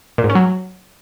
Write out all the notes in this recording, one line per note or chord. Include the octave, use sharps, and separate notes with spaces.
A#2
G#2
C#4
F#3